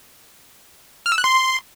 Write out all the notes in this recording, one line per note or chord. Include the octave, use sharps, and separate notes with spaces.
F6
E6
F#6
C6